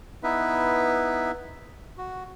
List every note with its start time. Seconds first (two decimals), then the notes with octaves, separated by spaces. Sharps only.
0.23 B3 D#4 E4 B4 E5
1.98 F#4